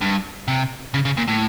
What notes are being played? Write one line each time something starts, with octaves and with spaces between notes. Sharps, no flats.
G2
C3
C#3
C#3
A#2
A2